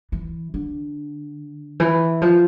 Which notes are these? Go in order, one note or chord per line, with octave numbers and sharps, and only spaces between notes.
E3
D3
E3
F3